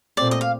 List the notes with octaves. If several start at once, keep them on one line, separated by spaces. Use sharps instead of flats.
A#2 A3 C4 D5
D#5
F5